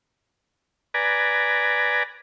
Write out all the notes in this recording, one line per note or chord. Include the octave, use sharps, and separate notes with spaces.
B4 D5 G#5 A#5